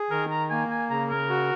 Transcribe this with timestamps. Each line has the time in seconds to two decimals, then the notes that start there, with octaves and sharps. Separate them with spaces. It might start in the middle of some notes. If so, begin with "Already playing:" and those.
Already playing: G#4
0.10 D#3 A#4
0.30 A#5
0.50 A#3 G#5
0.71 G#5
0.90 C#3 A#5
1.10 A#4
1.30 F#4